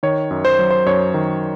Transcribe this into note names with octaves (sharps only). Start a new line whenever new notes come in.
D#3 C#5
F#2
C5
F#3
C5
F#2 C#5
D#3